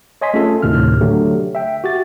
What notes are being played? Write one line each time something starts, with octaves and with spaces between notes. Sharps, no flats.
C#5 D#5 G#5 C6 B6
A3 C#4 F4 G#4 A4
D2 A2 C3 D#3 F6
D3 F#3 A3 G4
E5 G5
F#4 G4 A6